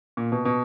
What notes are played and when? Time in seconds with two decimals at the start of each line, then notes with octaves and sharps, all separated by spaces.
0.17 A#2
0.32 B2
0.45 B2